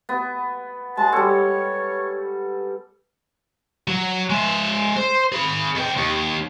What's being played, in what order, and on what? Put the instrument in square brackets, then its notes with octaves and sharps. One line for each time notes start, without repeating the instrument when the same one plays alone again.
[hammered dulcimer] B3
[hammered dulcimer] G#3 [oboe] A5
[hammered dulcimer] G3 A4 [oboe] C#5
[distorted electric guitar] F#3
G#3 E5
C5
G#4 B5
B2 G5
D#2